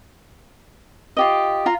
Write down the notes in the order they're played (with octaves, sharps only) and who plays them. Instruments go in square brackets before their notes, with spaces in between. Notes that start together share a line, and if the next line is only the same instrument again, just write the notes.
[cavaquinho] F4 G4 D#5
F4 A#5